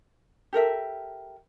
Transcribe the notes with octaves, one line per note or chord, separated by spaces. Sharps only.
G4 A4 A#4 E5